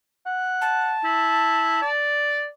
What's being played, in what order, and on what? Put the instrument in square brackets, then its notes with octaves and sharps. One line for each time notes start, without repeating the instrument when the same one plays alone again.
[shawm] F#5
[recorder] A5
[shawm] E4
D5